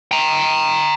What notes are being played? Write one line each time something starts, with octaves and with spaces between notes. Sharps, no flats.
G5 A#5